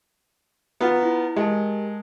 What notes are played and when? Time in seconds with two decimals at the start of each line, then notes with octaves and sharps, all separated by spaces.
0.81 B3 F4 A#5 B5 G#6
1.03 E4
1.36 G#3 G4 A#4 A5